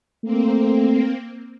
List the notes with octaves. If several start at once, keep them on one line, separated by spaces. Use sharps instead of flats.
A3 A#3 C4